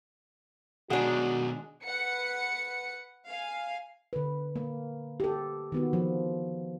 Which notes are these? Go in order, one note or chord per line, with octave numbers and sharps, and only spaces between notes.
B2 D#3 G#3 D4 F#4 G#4 F#5
B4 F#5 C#7
F5 G#5
D3 B4
A#3
G4 A4
D#3 B3 F#4
F3